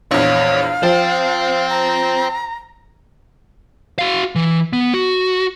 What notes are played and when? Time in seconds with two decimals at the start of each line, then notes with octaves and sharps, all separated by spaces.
0.11 A#1 E2 C#5 F5
0.83 F3 C5 G5
1.70 A#5
3.99 F#4 F5
4.35 E3
4.73 B3
4.94 F#4